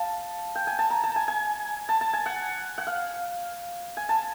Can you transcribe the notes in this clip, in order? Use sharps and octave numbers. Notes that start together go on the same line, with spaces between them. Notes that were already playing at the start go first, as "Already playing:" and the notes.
Already playing: F5 A5
G5
G#5
A5
A#5
A5
G#5
G#5
A5
A5
G#5
F#5
F#5
F5
G#5
A5